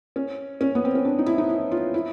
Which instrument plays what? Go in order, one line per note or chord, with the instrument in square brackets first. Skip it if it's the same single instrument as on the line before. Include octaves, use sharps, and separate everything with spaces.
[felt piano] C#4
C#4
B3
C4
C#4
D4
D#4
E4
D#4
E4
F4
E4